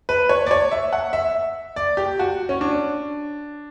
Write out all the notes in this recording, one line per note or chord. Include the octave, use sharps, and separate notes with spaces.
B4
C#5
D5
C#5
E5
F#5
E5
D5
G4
F#4
C#4
D4